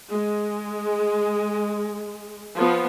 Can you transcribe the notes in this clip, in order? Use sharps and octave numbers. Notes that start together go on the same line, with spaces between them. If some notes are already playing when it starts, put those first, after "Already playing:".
G#3
F3 B3